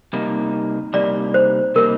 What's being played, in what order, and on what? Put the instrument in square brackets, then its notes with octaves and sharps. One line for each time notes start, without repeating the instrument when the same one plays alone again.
[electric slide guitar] C3 G3 A#3 D#4
[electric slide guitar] C3 G3 A#3 D#4 [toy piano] D5
[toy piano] C5
[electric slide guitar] C3 G3 A#3 D#4 [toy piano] A#4